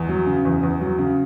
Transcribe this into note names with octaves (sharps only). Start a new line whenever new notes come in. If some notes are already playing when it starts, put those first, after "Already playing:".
Already playing: E2
F#3
C#3
E2
E2
F#3
C#3